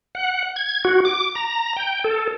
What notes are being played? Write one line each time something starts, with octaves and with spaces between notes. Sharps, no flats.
F#5
G#6
F#4
D6
A#5
G5
A4